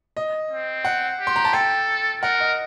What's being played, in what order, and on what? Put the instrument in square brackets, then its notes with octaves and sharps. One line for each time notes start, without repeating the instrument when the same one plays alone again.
[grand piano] D#5
[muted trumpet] C4
[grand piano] F#5
[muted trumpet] G4
[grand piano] C6
A#5
A5
[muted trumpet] A4 [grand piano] G5
[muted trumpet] A#4 [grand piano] F#5
[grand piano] D#5